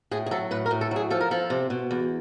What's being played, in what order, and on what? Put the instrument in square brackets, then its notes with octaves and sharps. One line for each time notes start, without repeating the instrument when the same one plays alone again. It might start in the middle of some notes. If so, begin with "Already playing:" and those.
[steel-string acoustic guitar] A2 G#4
G#4
F#3 A4
A2 B4
A#4
A2
A4
F#3 G#4
F3 A4
A#4
F3 A4
C3
B2
E2